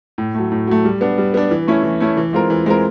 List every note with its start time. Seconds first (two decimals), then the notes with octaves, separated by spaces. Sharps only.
0.18 A2
0.34 F#3 A3
0.52 A2
0.67 F#3 A3
0.85 G3
1.01 B3 D4
1.18 G3
1.34 B3 D4
1.51 E3
1.67 A3 C#4 E4
1.83 E3
2.00 A3 C#4 E4
2.17 E3
2.33 G#3 C4 F4 A#4
2.50 E3
2.66 G#3 C4 F4 A#4